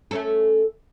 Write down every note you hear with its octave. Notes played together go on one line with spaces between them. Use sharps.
A3 C#4 A4